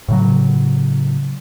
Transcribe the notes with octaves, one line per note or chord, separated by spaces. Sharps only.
A2 C#3 F#3